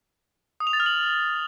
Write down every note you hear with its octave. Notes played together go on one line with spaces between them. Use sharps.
D#6
F7
A6
F6
F#7